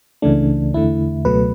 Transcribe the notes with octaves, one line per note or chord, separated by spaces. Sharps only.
C#2 C#3 E3 A3 D4
E2 D3 A3 E4
C#2 B2 F#3 A3 B4